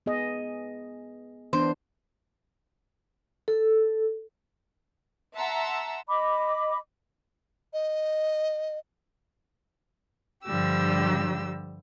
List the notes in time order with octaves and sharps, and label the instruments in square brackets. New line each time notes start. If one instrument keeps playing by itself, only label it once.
[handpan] B3 G#4 D#5
[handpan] E3 B3 D4 [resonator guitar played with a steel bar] C5
[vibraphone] A4
[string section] E5 F#5 A5 A#5 C6 E6
[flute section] D#5 B5 D6
[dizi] D#5
[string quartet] G2 D3 F3 G3 G4 E6